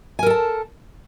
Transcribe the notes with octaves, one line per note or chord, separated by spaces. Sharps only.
A4 A#4 G#5 A5